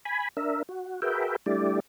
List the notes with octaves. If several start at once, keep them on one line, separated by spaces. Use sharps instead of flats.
G#5 B5
D4 A#4 E5
F#4
F#4 G#4 A#4 B4 E5 G5
G3 A3 D4 E4 G4 D5